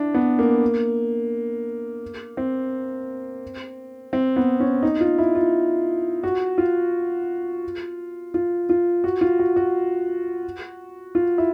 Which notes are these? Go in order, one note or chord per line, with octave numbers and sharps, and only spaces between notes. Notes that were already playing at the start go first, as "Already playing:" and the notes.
Already playing: D4 E4
B3
A#3
C4
C4
B3
C#4
D#4
F4
E4
F4
F#4
F4
F4
F4
F#4
F4
F#4
F#4
F4
E4